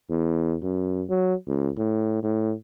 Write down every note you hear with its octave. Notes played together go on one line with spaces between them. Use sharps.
E2
F#2
F#3
C#2
A2
A2